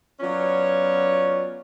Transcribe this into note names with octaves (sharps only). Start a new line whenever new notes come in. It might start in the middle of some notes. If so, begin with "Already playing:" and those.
F#3 B3 C#4 F4 C#5 D5